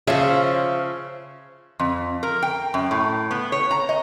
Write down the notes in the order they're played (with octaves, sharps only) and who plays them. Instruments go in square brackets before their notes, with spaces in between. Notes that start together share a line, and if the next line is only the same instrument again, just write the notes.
[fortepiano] C#3 F3 [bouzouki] F4 C5 C#5 [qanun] E5
[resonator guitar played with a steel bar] F2
A#4
G5
F#2
A2
B3
C#5
A#5
D#5